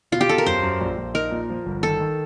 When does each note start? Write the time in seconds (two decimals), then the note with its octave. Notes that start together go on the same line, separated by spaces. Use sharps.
0.12 B2 F4
0.21 G4
0.29 B2 A4
0.38 A#4
0.46 F#2 C5
0.63 F#2
0.81 A#1
0.98 A#1
1.14 D#4 A#4
1.31 A#2
1.50 F3
1.66 G1
1.83 D#3 A4
2.00 D#3